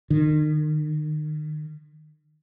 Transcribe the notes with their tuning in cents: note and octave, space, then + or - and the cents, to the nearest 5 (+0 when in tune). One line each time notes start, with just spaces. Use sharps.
D#3 -35